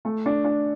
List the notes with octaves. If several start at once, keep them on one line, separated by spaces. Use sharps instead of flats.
A3
D4
D4